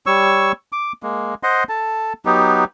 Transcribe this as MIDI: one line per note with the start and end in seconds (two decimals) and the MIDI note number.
0.06 0.52 55
0.06 0.52 73
0.06 0.52 85
0.06 0.52 88
0.72 0.92 86
1.03 1.34 56
1.03 1.34 58
1.43 1.64 72
1.43 1.64 75
1.43 1.64 78
1.43 1.64 84
1.69 2.13 69
1.69 2.13 81
2.25 2.64 54
2.25 2.64 59
2.25 2.64 63
2.25 2.64 67